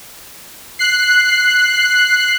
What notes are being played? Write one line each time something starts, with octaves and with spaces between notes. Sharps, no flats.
F#6 C7